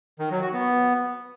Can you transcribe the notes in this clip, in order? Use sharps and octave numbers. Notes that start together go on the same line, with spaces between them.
D#3
F#3
F#4
B3